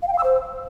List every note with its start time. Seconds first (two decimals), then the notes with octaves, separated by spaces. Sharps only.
0.02 F5
0.08 G5
0.13 F5
0.18 E6
0.24 C5